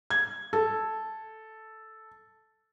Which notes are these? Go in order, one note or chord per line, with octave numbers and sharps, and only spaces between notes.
G#6
A4